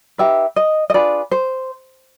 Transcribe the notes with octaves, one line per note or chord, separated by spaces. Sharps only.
D#4 G4 B4 E5
D#5
D#5
D4 F4 G#4 B4 D5
C5